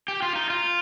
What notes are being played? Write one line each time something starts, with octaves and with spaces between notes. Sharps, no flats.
G4
F4
D#4
F4